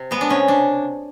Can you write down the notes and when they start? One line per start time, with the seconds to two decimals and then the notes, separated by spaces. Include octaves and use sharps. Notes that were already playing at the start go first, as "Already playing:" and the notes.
Already playing: C3
0.11 G#3 B3
0.21 D4
0.29 C3 C#4
0.48 C#3 D4